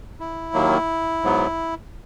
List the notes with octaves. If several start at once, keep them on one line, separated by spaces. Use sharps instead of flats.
E4
D#2 D#3 F#3 A#3
G#2 F#3 B3